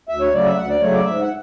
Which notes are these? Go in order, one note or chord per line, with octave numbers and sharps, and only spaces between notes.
D2 E5
C#5
C#3 F#3 A3 D5
E5
D2 F#5
D5
C#3 F#3 A3 C#5
D5
G#2 E5
F#5